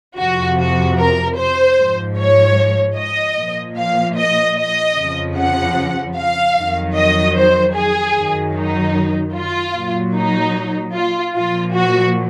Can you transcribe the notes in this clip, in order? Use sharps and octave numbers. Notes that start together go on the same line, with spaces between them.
F2 C3 F3 F#4
F#4
A#4
C5
G#2 F3
C#5
D#5
A#2 F3
F5
D#5
D#5
F2 C#3 F3
F#5
F5
F2 D#3 F#3
D#5
C5
G#4
F#2 D#3 F#3
D#4
F4
A#2 F#3
D#4
F4
A#2 F3 F4
F#4